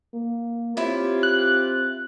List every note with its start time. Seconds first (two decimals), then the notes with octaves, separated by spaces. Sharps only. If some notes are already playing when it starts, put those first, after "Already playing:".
0.14 A#3
0.77 C4 E4 F4 G4 C#5
1.23 F#6